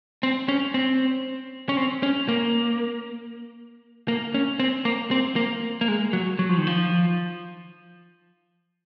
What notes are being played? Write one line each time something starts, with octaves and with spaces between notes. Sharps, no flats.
C4
C#4
C4
C#4
C4
C#4
A#3
A#3
C#4
C4
A#3
C4
A#3
A#3
G#3
F#3
F#3
F3
D#3
F3